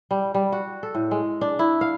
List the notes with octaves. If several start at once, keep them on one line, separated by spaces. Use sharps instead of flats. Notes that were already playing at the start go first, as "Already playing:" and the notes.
G3
G3
F#4
A4
A2
G#3
D4
E4
F5